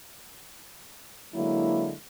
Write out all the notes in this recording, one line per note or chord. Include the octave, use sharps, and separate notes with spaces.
D3 F#3 G#3 A#3 E4